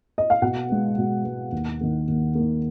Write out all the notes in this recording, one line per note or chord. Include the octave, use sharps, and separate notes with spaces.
D#5
F5
B2 F#5
G#3 B3
B2
G#3 B3
D#2
D#3 A#3
D#2
D#3 A#3